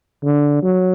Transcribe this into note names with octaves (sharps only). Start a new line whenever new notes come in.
D3
F#3